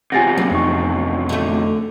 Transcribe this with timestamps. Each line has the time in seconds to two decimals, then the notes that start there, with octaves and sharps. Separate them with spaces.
0.12 E2 C3 F4 G4 F#5 G#5 A6 A#6
0.38 D2 F#3 A#3 C#4
0.51 F2 D#4 C#6
1.29 D3 A3